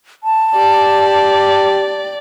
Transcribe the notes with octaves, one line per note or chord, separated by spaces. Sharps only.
A5
G4 D5